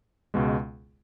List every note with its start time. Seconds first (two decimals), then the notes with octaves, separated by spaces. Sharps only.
0.34 C#2 B2 G#3